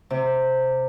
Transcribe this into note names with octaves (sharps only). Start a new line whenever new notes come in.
C3